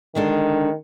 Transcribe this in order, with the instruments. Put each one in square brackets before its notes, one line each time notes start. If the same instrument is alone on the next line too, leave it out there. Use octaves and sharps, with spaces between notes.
[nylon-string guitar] D3 G#3 D4 [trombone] D#3